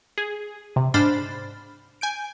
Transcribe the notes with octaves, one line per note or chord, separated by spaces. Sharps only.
G#4
C3
G#2 D4 C5 B5 F6 A6
G#5 G6 D7